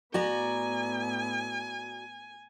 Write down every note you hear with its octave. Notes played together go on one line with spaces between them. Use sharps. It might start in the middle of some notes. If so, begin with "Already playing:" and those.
A2 B3 F#4 D5 G#5 A#5